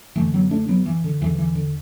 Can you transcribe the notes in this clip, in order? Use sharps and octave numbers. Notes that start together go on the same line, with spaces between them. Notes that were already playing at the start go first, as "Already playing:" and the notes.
F#2 D3 E3 A3
F#3 B3
A3 D4
F#3 B3
E3
D3
E2 D3 E3
E3
D3